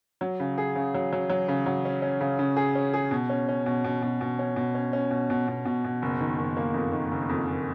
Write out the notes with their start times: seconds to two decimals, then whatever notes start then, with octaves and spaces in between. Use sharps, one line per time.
0.21 F#3
0.40 C#3
0.58 G#4
0.76 C#3
0.94 F#3
1.13 F#3
1.30 F#3
1.48 C#3
1.66 F#3
1.85 C#4
2.02 C#4
2.21 C#3
2.39 C#3
2.57 G#4
2.75 C#4
2.94 G#4
3.11 B2
3.29 C#4
3.48 C#4
3.66 B2
3.84 B2
4.02 B2
4.21 B2
4.39 C#4
4.56 B2
4.75 C#4
4.93 C#4
5.11 B2
5.30 B2
5.48 B2
5.65 B2
5.84 B2
6.02 F#1
6.20 D#3
6.38 F#1
6.57 A#3
6.74 F2
6.92 D#3
7.11 F#1
7.29 F2
7.47 F#1